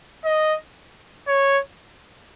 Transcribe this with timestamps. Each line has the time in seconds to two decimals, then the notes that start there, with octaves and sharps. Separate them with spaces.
0.25 D#5
1.28 C#5